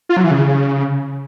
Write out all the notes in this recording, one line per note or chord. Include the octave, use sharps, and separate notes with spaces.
F4
F#3
E3
C#3